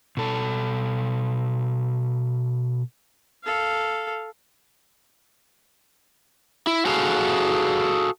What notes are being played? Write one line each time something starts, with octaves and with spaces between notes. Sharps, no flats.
B2 A4
A4 F5
E4
F#4 G#4 A4 F5